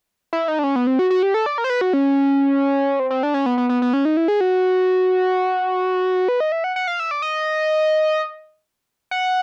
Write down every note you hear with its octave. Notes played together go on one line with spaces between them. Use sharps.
E4
D#4
D4
C#4
B3
C4
F#4
F#4
G4
A4
D5
A#4
C5
B4
F#4
C#4
C4
C4
D4
C#4
B3
B3
B3
B3
C#4
D#4
E4
G#4
F#4
B4
D#5
E5
F#5
F#5
F5
E5
D5
D#5
F#5